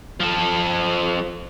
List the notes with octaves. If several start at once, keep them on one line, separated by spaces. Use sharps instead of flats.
F3 A4